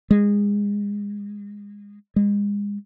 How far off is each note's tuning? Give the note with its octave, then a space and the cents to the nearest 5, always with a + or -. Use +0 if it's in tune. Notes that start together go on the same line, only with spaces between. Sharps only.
G#3 -25
G#3 -35